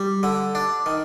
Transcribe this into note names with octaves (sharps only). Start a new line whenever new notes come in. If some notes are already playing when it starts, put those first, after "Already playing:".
Already playing: G3
D3
D4
D#3